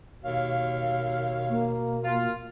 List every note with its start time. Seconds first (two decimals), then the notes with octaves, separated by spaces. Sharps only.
0.24 D#2 B2 C#5 F5
1.50 A#3
2.04 F4